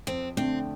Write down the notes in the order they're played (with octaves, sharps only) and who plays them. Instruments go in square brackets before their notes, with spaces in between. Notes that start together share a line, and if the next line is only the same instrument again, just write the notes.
[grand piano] F2 [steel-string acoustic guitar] C4
[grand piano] D3 A3 D4 [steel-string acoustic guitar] C4